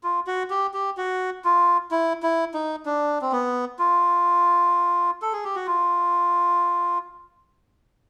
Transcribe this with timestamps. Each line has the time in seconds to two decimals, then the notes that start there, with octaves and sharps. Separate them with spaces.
0.04 F4
0.27 F#4
0.50 G4
0.74 G4
0.97 F#4
1.45 F4
1.91 E4
2.23 E4
2.54 D#4
2.86 D4
3.22 C4
3.32 B3
3.79 F4
5.22 A4
5.33 G#4
5.44 G4
5.56 F#4
5.67 F4